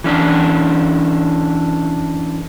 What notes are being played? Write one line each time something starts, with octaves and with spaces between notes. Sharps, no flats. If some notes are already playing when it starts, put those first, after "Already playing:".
E3 C#4 D4